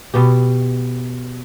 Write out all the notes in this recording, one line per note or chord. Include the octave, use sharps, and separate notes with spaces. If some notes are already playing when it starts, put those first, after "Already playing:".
B2 B3 G4